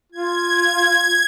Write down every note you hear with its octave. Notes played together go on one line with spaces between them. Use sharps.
F4 G#6